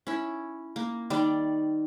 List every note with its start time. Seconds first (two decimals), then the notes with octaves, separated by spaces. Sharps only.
0.07 C#4 E4
0.76 A#3
1.10 D#3 G3 D5 D6